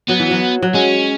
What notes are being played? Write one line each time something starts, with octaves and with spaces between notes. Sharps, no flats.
F#3 B3
E3
F#3
F#3
G#3 C#4